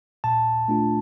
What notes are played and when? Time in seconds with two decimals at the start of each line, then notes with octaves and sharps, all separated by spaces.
0.24 A#2 A5
0.68 A3 D4 F4